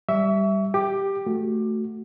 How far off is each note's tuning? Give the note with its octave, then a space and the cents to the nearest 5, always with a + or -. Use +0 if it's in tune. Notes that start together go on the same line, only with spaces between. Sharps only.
G3 +0 E5 +0 C#6 +35
G4 +0 D6 +20
A3 +0 F#4 +0